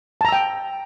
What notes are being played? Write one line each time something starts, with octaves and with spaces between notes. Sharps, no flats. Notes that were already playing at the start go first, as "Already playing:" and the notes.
G5 A5 A#5 E6